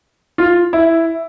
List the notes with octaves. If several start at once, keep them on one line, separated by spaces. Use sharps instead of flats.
F4
E4